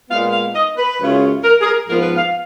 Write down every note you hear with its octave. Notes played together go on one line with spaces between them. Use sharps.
A#2 G#3 B3 F5
F5
D#5
B4
F#2 C#3 G#3 C#4 F4
A#4
G#4
A#4
G#2 F3 B3 F4 A#4
B4
F5